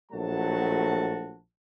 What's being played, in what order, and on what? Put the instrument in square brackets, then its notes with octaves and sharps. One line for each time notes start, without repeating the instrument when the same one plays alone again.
[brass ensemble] A#1 A2 F#3 A3 F#4 A5